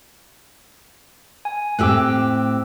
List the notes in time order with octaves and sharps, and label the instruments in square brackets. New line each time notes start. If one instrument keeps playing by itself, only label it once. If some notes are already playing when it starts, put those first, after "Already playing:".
[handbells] G#5
[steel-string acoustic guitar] A2 C4 G4 [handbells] D6 E6 F#6